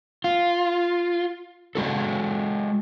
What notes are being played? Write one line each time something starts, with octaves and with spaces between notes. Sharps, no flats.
F4
G#3 F#4 A4